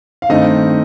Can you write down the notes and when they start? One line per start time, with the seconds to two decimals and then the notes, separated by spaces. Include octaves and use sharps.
0.22 F5
0.29 G2 D#3 A3 C4 D#5